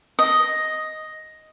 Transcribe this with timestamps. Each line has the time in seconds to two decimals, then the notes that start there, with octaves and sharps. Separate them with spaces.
0.19 D#5